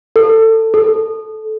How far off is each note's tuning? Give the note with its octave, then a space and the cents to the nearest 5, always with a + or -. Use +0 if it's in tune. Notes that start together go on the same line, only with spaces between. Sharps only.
A4 +20
A4 -15